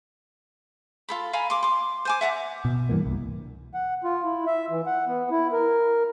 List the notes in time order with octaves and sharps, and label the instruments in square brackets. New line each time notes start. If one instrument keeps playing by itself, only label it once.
[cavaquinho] F4 A4 B5
F5 G#5 A#5 B5
C6 D6
C6 D6
C5 G#5 D6
E5 F#5 A5 A#5
[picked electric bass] B2
G2 E3 A#3
C2
[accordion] F#5
F4
E4
E5
E3
F#5
B3
E4
A#4